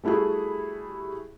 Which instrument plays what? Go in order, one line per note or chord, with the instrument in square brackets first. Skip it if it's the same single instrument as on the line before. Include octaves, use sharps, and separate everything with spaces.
[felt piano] G3 A3 E4 F#4 G#4